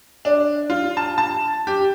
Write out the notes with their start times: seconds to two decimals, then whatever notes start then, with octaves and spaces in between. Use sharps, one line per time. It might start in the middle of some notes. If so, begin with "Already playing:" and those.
0.25 D4
0.70 F4
0.97 A5
1.18 A5
1.67 G4